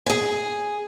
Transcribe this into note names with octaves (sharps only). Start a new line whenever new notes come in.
G#4 G#5